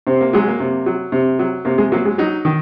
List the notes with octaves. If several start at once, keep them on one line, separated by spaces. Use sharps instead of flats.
C3 C4
A#3
F#3 G#3
A#3
C3
F#3
C3
F#3
C3 A#3
G#3
F#3 A#3
G#3
F#3 D#4
D#3